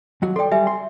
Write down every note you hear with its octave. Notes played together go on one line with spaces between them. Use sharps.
D#2 F#3 F#4
A4 D5 G5 C6
G3 E5 G#5
C6